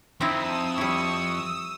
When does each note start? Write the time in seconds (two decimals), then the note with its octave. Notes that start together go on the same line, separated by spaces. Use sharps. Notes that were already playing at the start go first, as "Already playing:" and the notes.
0.21 F2 C4 D#4 E4 D#6 E6
0.78 G3 E4 C#6